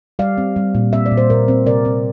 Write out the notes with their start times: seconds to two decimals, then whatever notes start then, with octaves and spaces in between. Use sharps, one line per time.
0.19 G3 D5 F5
0.38 C4
0.56 G3
0.75 A#2
0.92 C4 E5
1.06 D5
1.11 A#2
1.17 C5
1.30 A#2 A#4 D5
1.48 C4
1.66 C3 A#4 D5
1.85 C4